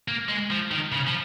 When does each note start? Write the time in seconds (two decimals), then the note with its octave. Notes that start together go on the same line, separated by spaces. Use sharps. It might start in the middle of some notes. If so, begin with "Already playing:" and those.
0.08 A#3
0.29 G#3
0.50 F3
0.71 D#3
0.92 C#3
1.07 F3